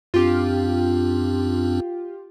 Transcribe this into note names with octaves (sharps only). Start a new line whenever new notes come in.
F#2 C4 D4 F4 G4